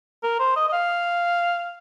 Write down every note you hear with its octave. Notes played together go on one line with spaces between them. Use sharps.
A#4
C5
D#5
D#5
F5